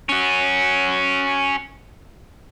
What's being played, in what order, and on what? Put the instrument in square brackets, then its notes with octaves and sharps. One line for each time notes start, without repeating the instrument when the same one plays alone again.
[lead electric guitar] C#4 F#4